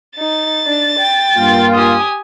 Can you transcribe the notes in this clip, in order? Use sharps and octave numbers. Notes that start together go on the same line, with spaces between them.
D#4 A6
D4
G5
G2 A#3 F4
G4 G#5 D#6